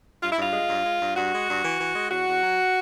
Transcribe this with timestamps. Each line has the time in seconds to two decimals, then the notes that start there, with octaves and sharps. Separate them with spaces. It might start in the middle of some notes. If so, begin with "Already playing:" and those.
0.22 G2 F4
0.32 E4
0.38 G2 F4
0.53 G#3
0.69 G2
0.86 G#3
1.01 G2
1.17 G2 F#4
1.32 G#3
1.49 G2
1.64 E3
1.80 E3
1.95 G#3
2.11 E2 F#4
2.27 E2
2.42 F#3